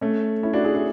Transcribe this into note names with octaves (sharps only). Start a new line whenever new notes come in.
A3 C#4
C#4 E4
D4 F#4
E4 G#4
E4 G#4